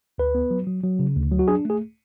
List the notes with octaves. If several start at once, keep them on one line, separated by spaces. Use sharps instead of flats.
D2 B4
B3
F#3
F#3
F#3
C#3
D2
F#3
F#4
D4 G#4
A3 G#4